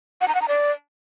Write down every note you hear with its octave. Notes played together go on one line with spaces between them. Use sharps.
F#5
A#5
F#5
A#5
D5